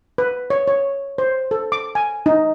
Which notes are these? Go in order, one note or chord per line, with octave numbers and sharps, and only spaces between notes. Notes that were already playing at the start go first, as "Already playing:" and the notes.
B4
C#5
C#5
C5
A4
D6
G#5
D#4